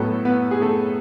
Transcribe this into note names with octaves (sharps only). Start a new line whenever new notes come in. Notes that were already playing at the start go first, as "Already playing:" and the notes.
Already playing: A2 F#3 A3 B3 A4
B3 B4
G#4
A3 A4